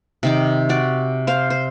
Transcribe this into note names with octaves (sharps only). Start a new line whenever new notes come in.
C3 D#3 D6
F#4 D5
C5 F5
C5